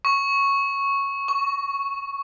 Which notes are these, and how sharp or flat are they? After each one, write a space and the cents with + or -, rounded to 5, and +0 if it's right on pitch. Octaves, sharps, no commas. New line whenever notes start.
C#6 -5
C#6 +25